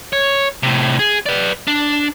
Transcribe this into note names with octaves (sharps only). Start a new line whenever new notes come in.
C#5
A2 C3
G#4
B4 D5
D4